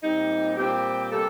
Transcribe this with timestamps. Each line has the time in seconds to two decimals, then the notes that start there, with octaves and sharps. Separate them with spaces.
0.02 A#2 G3 C4 D#4
0.56 A#2 G3 C4 G4
1.10 C3 G3 A#3 A4